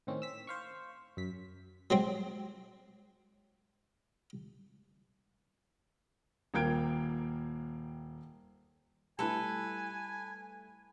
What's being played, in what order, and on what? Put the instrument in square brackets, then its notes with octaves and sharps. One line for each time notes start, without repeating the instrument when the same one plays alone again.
[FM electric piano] A2 D#3 C4 C#4
E6 B6
C5 F5 C#6
F#2 B6
[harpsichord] F#3 G#3 C4
[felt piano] D#1 A#3 A#4 G5 G#6 D7
[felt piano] G3 A3 E4 [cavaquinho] A4 B4 [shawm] G#5